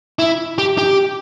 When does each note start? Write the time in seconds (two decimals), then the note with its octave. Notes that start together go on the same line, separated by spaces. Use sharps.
0.19 E4
0.58 G4
0.78 G4